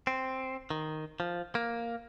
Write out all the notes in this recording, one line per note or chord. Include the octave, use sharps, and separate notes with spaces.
C4
D#3
F3
A#3